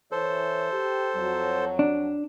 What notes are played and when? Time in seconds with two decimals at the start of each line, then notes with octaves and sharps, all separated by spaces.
0.12 E3 A4 C5 C#5
0.72 G4
1.16 F2 F#3
1.79 D4